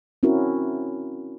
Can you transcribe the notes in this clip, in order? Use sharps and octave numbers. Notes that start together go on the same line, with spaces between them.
C4 C#4 E4 F#4 A#4